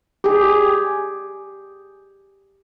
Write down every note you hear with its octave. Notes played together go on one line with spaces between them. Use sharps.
G4 G#4